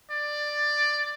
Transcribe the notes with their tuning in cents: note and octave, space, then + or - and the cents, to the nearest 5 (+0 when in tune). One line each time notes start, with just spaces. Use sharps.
D5 +10